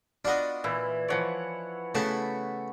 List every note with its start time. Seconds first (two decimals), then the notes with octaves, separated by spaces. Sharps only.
0.25 B3 D4 F4 F#4 D#5
0.64 A#2 E3 E4
1.08 E3 F3 C#5 D5 F#5
1.95 C#3 A3 B3 E4 F#4 A5 C#6